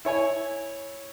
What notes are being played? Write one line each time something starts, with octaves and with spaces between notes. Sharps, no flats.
E4 C#5 G#5